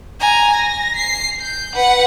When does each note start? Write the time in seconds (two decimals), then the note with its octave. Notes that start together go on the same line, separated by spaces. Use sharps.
0.20 G#5 A#5
0.53 A#6
0.96 C7
1.41 G6
1.74 B4 F#5